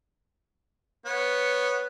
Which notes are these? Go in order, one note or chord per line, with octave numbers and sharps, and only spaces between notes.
B3 C#5